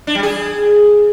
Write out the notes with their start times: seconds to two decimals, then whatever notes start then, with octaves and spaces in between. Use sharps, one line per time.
0.07 D4
0.15 G3
0.23 G#4